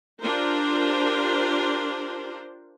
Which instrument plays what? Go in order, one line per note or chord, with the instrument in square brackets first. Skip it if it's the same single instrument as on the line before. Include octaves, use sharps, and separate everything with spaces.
[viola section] D4 F4 G4 A#4 C5